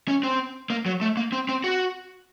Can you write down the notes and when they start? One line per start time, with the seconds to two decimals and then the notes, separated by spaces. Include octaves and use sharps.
0.08 C#4
0.23 C4
0.70 A#3
0.86 F#3
1.01 A3
1.17 A#3
1.32 C4
1.49 C4
1.64 F#4